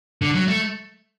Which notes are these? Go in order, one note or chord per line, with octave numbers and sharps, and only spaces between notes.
D3
F#3
A3